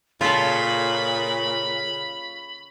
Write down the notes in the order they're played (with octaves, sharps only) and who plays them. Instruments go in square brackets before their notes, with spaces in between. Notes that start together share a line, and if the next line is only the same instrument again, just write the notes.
[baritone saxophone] A#2 [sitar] C#3 [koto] F4 A4 [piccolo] B5